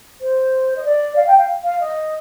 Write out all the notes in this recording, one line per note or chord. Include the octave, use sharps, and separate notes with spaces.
C5
D#5
D5
F5
G5
F5
F5
D#5